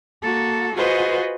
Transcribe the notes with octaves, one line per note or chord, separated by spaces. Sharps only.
A#3 F#4 A4
F4 F#4 G#4 B4 C5 D#5